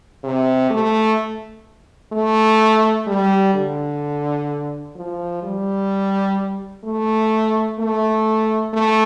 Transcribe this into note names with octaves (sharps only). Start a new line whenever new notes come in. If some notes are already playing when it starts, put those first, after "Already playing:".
C3
A3
A3
G3
D3
F3
G3
A3
A3
A3